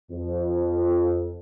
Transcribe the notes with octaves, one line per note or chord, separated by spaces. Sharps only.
F2